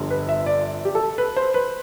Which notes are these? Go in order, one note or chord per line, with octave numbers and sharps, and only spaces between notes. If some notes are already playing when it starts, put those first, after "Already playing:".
Already playing: G1 F2 D3 G3
B4
E5
D5
G4
A4
B4
C5
B4